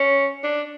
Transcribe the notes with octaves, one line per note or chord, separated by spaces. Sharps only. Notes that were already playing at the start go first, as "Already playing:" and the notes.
Already playing: C#4
D4